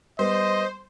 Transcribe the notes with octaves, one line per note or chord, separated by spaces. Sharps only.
G3 B3 C5 D#5